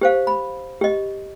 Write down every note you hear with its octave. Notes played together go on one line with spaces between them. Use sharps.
G4 C5 F5
B5
G4 D#5